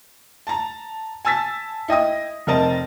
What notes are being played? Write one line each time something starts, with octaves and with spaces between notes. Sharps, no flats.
A5 A#5
G#5 A5 E6 A6 B6
E4 D#5 G5 D#6
F1 C4 A#4 D#5 A5 A#5